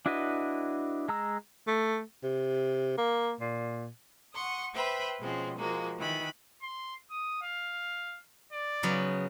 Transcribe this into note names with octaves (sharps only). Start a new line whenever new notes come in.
D4 E4 F#4 B4 D#5
G#3 A#5 E6
A3
C3
A#3
A#2
F#5 C6 C#6 D#6
B4 C5 E5 G5 B5
B2 F3 G#3 C4 C#4
F3 G#3 A#3 F#4
D#3 E3 B5
C6
D#6
F5
D5
C#3 F#3 B3